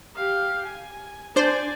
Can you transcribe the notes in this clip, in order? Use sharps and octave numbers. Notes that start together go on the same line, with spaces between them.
G4 F5
G#5
D4 C5 D5 G#5